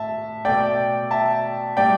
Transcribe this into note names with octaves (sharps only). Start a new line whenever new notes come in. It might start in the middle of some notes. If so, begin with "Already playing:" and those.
Already playing: A2 E5 A5
B2 A3 D5 G5
E5 A5
A2 G3 D5 G5